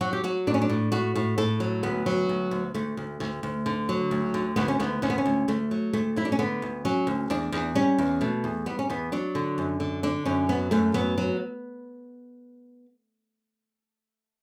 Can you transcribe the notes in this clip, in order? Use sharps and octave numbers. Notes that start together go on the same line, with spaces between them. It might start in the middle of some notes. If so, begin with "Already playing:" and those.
F#3 F#4
G4
F#3 F#4
A2 D4
C#4
D4
A2
A2 F#4
A2
A2 A4
F#3
D2 B3
F#3
D2
D2
D2 A3
D2
D2
D2
D3
F#3
D2
D3
D2 B3
C#4
D2 B3
D2 C#4
B3
C#4
D2
D2 A3
F#3
D2 A3
F#3 E4
D4
C#4
D3 B3
D2
F#3 C#4
D2
E2 D4
E2
G3 C#4
E2
B2 A3
E2
G3 B3
C#4
E2 B3
F#3 D4
D3
F#2
D3
D3 D4
F#2 C#4
F#3 B3
F#2 A3
F#3 B3
F#3